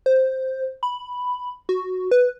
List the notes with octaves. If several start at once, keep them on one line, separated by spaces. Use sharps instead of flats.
C5
B5
F#4
B4